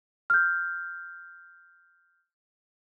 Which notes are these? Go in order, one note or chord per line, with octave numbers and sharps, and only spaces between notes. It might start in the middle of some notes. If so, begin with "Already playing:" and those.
F6 G6